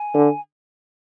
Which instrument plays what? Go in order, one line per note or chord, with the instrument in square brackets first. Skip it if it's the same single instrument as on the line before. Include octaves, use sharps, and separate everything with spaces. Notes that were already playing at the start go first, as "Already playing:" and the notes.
Already playing: [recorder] G#5
[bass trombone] D3